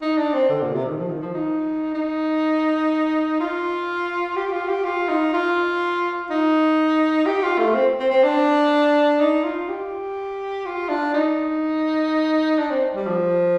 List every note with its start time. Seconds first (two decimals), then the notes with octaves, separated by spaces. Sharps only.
0.02 D#4
0.18 D4
0.33 C4
0.49 D3
0.62 A#2
0.73 C3
0.86 D#3
0.98 F3
1.10 D#3
1.21 F3
1.34 D#4
1.94 D#4
3.40 F4
4.36 G4
4.52 F4
4.68 G4
4.84 F4
5.09 D#4
5.33 F4
6.30 D#4
7.26 G4
7.43 F4
7.59 A3
7.74 C4
8.00 C4
8.10 C4
8.23 D4
9.20 D#4
9.44 F4
9.68 G4
10.66 F4
10.89 D4
11.14 D#4
12.59 D4
12.70 C4
12.95 G3
13.07 F3